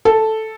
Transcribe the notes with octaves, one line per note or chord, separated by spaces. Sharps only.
A4